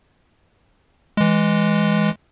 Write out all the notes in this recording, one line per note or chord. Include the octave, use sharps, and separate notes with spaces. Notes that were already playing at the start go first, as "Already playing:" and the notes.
E3 G#3